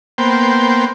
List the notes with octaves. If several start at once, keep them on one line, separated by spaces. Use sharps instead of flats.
A#3 B3 C5 G5